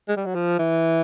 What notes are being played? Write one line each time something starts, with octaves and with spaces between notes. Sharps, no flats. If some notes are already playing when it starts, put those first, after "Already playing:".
G#3
G3
F#3
F3
E3